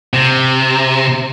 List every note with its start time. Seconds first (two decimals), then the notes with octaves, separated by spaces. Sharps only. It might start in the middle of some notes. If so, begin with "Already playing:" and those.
0.14 C3